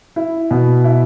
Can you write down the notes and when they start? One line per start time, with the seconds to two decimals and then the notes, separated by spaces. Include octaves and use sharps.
0.16 E4
0.51 B2
0.84 E4